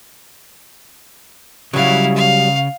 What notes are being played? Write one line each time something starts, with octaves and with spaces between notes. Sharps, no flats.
C#3 F#3 G3 E4 F5
F5